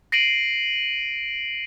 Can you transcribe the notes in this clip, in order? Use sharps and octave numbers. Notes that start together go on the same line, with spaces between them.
A#6 C7 D7 D#7 F#7